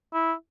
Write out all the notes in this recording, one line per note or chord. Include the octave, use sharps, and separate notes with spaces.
E4